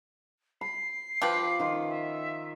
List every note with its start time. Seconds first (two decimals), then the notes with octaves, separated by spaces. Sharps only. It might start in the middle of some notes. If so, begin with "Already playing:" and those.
0.61 B5 C7
1.22 F3 F4 G4 B4
1.59 D#3 F4
1.89 E5